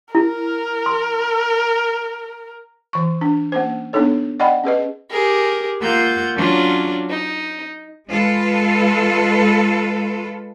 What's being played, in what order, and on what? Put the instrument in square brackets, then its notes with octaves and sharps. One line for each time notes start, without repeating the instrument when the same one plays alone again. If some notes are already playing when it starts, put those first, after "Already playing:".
[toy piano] E4 [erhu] A#4
[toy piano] C6
[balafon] E3 C#6
D4
A#3 C#4 C5
B3 D4 D#4 A4 C#5
D5 D#5 F#5 G5 B5
C#4 G#4 B4 D#5
[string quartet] G4 G#4 A#4
A#3 F4 F#5 E6 G6
F#3 C#4 D4 F4
D#4
[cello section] G#3 F4 A4 B4